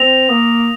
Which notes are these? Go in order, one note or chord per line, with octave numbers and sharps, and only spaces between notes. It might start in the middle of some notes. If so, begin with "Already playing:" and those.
Already playing: C4 A#6 F7
A#3 D#6